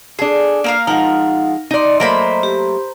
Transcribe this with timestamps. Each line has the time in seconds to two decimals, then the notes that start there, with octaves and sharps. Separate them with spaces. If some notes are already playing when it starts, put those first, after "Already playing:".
0.19 D4 G#4 A4
0.64 A#3 A#4 F5
0.87 F3 G#3 D#4 A#4 F5 F#5
1.71 D#4 D5 D#5 C6
2.00 F#3 A3 A#3 A#4 C5 B5
2.43 G4